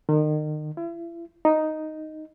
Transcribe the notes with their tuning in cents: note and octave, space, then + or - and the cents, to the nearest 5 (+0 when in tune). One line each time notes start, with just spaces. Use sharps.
D#3 -35
E4 +40
D#4 +0